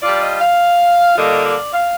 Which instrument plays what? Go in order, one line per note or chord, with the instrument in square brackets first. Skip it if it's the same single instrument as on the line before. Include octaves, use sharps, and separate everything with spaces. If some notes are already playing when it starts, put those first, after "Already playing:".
[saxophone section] G3 D4 F4 D5
D#5
F5
D3 G3 A#3 F4 D#5
D5
F5